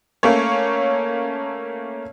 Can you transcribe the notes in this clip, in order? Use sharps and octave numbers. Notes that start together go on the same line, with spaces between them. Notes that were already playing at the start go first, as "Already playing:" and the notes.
A3 A#3 C#4 C#5